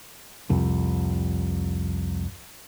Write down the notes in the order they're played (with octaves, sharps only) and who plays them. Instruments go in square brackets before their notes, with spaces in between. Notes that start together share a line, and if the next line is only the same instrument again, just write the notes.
[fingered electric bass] C2 F2